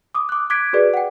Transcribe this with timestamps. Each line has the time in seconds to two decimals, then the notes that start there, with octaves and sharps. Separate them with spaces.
0.15 D6 D#6
0.29 D6 F#6
0.50 D6 F#6 G#6 B6 D7
0.73 F#4 G#4 B4 D5
0.94 F#5 G5